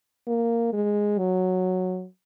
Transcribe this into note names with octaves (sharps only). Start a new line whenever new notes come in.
A#3
G#3
F#3